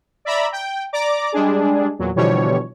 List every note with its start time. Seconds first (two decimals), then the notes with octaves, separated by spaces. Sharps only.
0.25 D5 E5 A#5 B5
0.52 G5
0.93 D5 A#5 D6
1.32 G3 G#3 D4 G#4
1.99 E2 A#2 F#3
2.16 B2 D3 E3 F3 G3 C#5